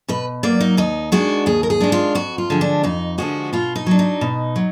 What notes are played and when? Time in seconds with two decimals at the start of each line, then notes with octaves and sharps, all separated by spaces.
0.09 B2 B4
0.43 F#3 A#3 D5
0.60 D#4
0.77 D#2 D#4
1.12 D#3 G#3 D4 F#4
1.46 D#2 G#4
1.63 A#4
1.70 G#4
1.80 D#3 G#3 D4
1.92 F4
2.15 F2 F#4
2.38 F4
2.50 D3 F3 G#3
2.61 D4
2.83 F2 D#4
3.18 D3 F3 G#3 F#4
3.53 B2 F4
3.76 D#4
3.86 F#3 D4
3.99 D#4
4.21 B2
4.56 F#3